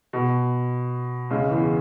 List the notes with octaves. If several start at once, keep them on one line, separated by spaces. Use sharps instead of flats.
B2
C#2 C#3
E2 E3